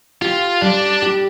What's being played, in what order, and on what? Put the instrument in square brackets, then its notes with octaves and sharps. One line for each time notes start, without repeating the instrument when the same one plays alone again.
[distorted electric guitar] F4 [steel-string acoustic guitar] G4
[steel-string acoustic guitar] G3 [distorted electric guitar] D4
[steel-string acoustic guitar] G4